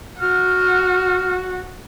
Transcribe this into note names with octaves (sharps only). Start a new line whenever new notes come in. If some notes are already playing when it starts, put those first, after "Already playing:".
F#4 F6